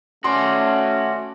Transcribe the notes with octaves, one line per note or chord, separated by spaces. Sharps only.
A3 C#4 F#4 D5 C6